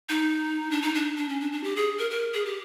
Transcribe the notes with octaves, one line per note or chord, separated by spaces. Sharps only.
D#4
D4
D#4
D4
D4
C#4
D4
D4
G4
G#4
A#4
A#4
G#4
G4